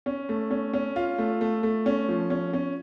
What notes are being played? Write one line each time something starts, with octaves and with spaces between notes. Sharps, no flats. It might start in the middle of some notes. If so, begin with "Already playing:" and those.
C#4
A3
C#4
C#4
F4
A3
A3
A3
C#4
F3
C#4
C#4